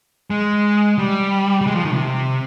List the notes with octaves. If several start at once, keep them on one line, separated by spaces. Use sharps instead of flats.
G#3
G3
G3
G#3
F3
D#3
C3